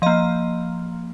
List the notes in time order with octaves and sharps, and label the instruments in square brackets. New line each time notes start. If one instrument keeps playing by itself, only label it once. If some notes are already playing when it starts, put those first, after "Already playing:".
[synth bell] F3 A#3 D#5